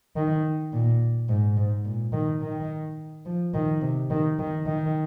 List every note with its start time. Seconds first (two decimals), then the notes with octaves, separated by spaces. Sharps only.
0.16 D#3
0.73 A#2
1.29 G#2
1.57 G#2
1.85 A#2
2.13 D#3
2.42 D#3
3.26 F3
3.54 D#3
3.82 C3
4.11 D#3
4.39 D#3
4.66 D#3